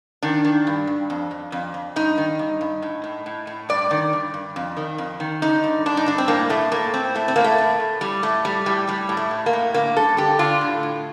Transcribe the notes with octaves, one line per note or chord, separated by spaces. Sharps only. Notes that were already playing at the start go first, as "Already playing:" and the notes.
D#3 D4
D#3
G2
G2
F2
F2
F2
F2
G2 D#4
D#3
G2
G2
A2
A2
A2
A2
G2 D5
D#3
G2
G2
F2
D#3
F2
D#3
D3 D#4
G2
G2 D4
D#4
G2 D4
C4
A2 A#3
A2 A3
A2 A#3
A2 C4
A2 A3
C4
A2 A#3
A3
A2
A2
A2 G3
A2 A3
A2 G3
A2 G3
A2 G3
A2
A3
A2
A#3
A2
D3 A#3
G2 A4
D3 G4
D3 F4
A2
A2